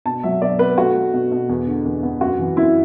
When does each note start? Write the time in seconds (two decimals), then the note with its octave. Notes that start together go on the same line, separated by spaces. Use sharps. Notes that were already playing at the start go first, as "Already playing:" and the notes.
0.05 B2 A5
0.23 F#3 E5
0.41 B2 D5
0.59 B3 B4
0.77 A3 F#4
0.96 A3
1.13 B2
1.31 B2
1.49 E2
1.67 D3
1.85 E2
2.03 B3
2.21 F#2 F#4
2.39 E3
2.57 F#2 E4